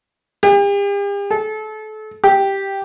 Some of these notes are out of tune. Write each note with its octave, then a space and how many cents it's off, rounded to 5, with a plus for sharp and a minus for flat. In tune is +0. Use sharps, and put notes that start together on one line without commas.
G4 +45
A4 -30
G4 +0